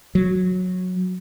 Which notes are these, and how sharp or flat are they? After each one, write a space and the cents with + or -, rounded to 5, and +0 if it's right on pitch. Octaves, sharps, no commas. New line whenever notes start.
F#3 -15